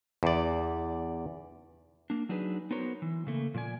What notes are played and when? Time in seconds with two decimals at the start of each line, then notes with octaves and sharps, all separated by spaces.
0.23 E2 D5
2.10 A#3 D4
2.29 F#3 D4 D#4 G#4 B4
2.71 B3 D#4 F#4 A#4 C5 C#5
3.02 E3
3.27 C#3 A3 A#3
3.54 A#2 F3 D5 G#5